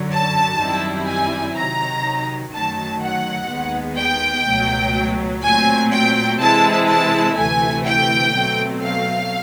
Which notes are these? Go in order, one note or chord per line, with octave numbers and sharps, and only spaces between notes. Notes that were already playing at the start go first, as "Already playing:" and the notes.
Already playing: F#2 D3 F#3
A5
F#2 D#3 G3 C4 E4
G#5
C3 D#3 F#3 A#5
F#2 D#3 F#3 A3 A5
F#5
D#2 D#3 G#3 B3
G5
C#2 B2 F#3 A3
A#2 F#3 A3 C4 G#5
G5
C3 E3 G#3 C4 E4 A5
A5
D2 C3 E3 A3 G#5
G5
B2 F#3 A3 C4
F5